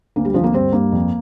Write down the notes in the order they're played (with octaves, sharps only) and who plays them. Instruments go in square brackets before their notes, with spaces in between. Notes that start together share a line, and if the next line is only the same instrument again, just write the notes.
[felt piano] D2 A#3
G3
D2 F3
A#3
G2 C4
G2 A#3
F2